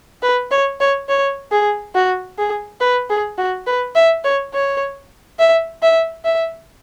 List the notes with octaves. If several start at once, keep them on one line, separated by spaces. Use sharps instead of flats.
B4
C#5
C#5
C#5
G#4
F#4
G#4
B4
G#4
F#4
B4
E5
C#5
C#5
E5
E5
E5